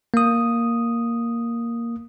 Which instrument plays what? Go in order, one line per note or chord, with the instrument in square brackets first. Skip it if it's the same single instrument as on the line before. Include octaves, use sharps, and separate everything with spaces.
[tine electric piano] A#3 D#6